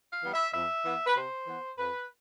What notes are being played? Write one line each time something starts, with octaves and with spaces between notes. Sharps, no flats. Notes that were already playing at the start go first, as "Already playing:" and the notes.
F5
E3 G3 B3
E5
F2 E5
E3 B3
B4
C3 C5
E3 B3
F2 B4